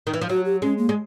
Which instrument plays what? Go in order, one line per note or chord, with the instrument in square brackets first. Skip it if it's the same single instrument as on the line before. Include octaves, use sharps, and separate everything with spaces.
[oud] D#3
E3
F3
[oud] F#3 [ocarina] F#4
[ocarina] G4
[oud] G#3 [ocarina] C#4
[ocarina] A#3
[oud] G#3